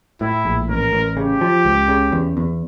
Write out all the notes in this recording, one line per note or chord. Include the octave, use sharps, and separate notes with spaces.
A2 E4
A#1
A1 A#4
A1
C#3 G4
F3
C#2
C#3
E2
E2